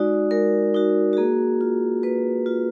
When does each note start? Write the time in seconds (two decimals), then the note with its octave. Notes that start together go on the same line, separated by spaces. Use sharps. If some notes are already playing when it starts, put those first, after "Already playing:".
Already playing: G#3 D#4 F#4 D5
0.31 G#3 A#4
0.74 D#4 F#4
1.13 F#4
1.17 A#3 G#4
1.61 F4
2.03 A#3 B4
2.46 F4